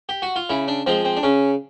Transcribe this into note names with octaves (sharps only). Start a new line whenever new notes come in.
G4
F#4
F4
C#3 E4
D4
F3 G#3 C4
C4
D4
C#3 C#4